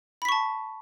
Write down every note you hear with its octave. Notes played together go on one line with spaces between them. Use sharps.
A5 B5 C#6 B6